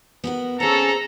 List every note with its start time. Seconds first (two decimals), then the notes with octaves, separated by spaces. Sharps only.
0.24 B3 F#4 A#4
0.60 C4 C#4 G#4 A4 A#5